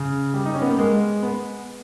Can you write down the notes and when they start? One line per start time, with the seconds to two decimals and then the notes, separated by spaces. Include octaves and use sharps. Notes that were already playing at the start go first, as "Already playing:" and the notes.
Already playing: C#3
0.34 G3
0.45 D#4
0.54 C#4
0.62 B3
0.70 A#3
0.79 G#3
1.23 B3